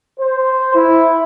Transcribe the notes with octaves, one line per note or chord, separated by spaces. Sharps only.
C5
E4